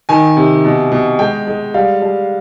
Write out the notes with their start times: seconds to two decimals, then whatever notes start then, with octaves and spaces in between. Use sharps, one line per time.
0.09 D#3 G#5
0.37 C3
0.65 B2
0.92 B2
1.19 G#3 G5
1.47 G#3
1.74 G3 F5
2.02 G3